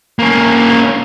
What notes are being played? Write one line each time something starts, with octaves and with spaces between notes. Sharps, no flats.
A#3 C#4